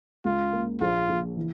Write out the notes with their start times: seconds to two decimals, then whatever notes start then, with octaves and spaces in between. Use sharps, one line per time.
0.25 C#2 F4
0.53 A#3
0.81 A#1 F4
1.09 A#1
1.36 E3